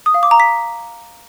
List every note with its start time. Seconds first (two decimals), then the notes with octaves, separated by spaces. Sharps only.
0.06 D#6
0.14 F5
0.23 D6
0.31 A#5
0.40 B6